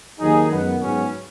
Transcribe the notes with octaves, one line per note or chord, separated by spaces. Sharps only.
D#2 D#3 F#3 D#4 G#4
F#2 D#3 G#3 B3
G#2 F#3 B3 C#4